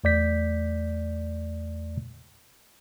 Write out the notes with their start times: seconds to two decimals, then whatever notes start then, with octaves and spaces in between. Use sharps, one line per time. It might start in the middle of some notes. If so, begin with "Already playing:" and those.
0.04 E2 A3 D5 G6 B6